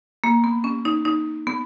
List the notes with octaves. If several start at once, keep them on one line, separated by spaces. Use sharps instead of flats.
A#3
B3
C#4
D#4
D#4
B3